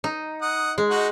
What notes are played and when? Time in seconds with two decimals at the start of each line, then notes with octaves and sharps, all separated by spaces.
0.04 D#4
0.42 F#5 D#6
0.78 G#3
0.90 D#4 F#4 F#5